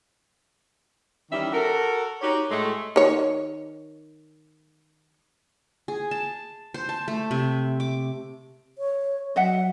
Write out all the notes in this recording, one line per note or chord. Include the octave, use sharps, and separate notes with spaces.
D#3 E3 G3 C#4 E5
F#4 A4 A#4
D#4 F#4 G4 C#5
A2 G#3 A3
D#3 C#5
G#4
A5
C5
A5
A3
C3
D6
C#5
F#3 D#5 E5 F#5